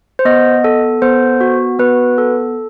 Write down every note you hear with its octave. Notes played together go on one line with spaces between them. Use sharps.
C5
B3 D#5
A4
B3 C5
F#4
B3 B4
A4